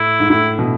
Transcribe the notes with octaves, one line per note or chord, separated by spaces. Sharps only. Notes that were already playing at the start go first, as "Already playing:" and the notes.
Already playing: A2 E4
G#2
A2 E4
B2